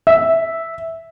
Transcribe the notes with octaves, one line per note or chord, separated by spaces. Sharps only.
E5